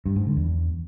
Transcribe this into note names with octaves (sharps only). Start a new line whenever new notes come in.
G2
G#2
D3
E2